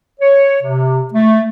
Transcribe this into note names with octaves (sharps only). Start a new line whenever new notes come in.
C#5
C3
A3